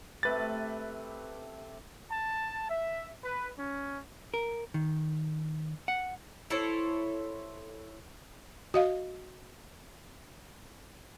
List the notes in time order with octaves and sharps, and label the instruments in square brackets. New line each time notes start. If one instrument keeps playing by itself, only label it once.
[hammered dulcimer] C3 A3 G4 [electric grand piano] B4 A6
[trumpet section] A5
E5
B4
C#4
[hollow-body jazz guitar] A#4
D#3
F#5
[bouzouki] E4 A4 C5 C#5
[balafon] F#4 D#5 F5